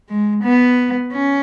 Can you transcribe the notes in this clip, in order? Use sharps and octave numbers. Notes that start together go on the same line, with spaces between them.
G#3
B3
C#4